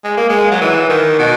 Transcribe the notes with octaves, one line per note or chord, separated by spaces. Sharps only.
G#3
A#3
G#3
F#3
E3
D#3
B2